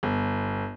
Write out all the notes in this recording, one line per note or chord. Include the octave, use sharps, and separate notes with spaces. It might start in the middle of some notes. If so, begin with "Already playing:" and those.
G1